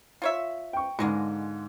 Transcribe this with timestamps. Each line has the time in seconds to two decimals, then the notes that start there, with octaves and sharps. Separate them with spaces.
0.22 F4 C#5 E5
0.73 G5 C#6
0.99 G#2 B2 D3 G#3 A#3